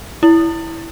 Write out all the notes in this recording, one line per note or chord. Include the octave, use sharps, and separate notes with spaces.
E4